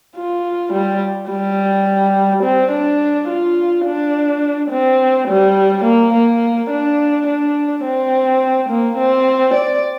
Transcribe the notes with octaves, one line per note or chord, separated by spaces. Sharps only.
F4
G3
G3
C4
D4
F4
D4
C4
G3
A#3
A#3
D4
D4
C4
A#3
C4
D5